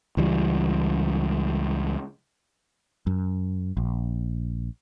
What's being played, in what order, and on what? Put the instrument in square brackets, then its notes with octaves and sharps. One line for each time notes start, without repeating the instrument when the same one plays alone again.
[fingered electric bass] C#2 E3 G3
[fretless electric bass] F#2
A#1